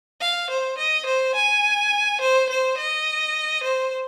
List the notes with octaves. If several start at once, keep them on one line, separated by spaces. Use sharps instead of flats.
F5
C5
D#5
C5
G#5
C5
C5
D#5
C5